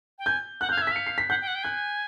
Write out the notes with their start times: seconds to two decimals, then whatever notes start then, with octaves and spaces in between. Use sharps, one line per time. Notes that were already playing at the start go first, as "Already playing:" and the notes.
0.19 G5
0.26 G#5 G6
0.61 F#5 F#6
0.69 F5 G6
0.78 G#6
0.82 E5
0.87 B6
0.92 F5 C#7
1.07 C7
1.18 B6
1.29 F#5 G6
1.41 G5
1.47 F#5
1.55 G5
1.63 G#5 F#6